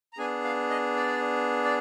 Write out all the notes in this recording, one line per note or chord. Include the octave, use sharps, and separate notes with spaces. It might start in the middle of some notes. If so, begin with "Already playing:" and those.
A#5
B3 D4 G#4 G#5
F5
D#5
D5
D5